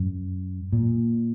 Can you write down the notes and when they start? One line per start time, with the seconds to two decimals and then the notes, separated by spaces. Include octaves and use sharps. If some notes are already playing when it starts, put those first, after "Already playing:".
Already playing: F#2
0.73 A#2